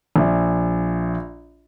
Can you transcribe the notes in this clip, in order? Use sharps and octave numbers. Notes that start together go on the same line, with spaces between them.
A#1 E5